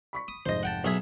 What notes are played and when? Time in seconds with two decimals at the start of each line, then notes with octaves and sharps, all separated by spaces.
0.13 B5 C#6 B6
0.28 D#6
0.46 F1 G#2 C5 D#5 A#6
0.63 F#5 G5 A5
0.84 B1 G#4 E5 D#6 G#6